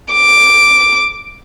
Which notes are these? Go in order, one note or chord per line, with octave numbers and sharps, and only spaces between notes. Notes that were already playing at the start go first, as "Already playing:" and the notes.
D6